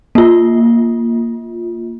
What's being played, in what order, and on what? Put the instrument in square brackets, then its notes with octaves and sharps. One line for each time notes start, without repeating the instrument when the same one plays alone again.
[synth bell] A#3 F4